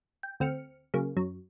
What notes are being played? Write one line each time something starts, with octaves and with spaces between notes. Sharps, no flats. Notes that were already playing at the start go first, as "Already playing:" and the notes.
G5
D2 C4 F6 C#7
C#3 F#3 A#3
F#2 F#3